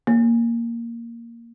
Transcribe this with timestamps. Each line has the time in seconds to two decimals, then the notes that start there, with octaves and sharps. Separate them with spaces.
0.07 A#3